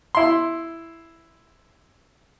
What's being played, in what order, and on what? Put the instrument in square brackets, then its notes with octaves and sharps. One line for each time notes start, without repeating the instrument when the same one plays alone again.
[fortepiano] E4 C6